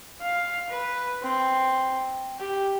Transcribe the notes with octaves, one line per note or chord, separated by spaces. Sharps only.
F5
B4
C4
G4